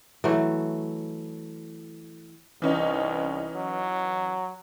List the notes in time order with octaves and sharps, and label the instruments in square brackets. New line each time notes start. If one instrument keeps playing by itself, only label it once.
[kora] E3 F#3 A3
[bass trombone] C2 [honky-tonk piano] E3 C#4 D#4
[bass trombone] F#3